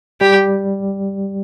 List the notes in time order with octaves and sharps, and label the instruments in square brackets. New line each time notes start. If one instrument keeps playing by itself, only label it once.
[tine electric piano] G3 [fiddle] G4